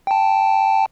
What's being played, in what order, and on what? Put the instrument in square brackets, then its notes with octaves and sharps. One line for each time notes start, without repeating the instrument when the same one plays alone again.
[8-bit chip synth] G5 A5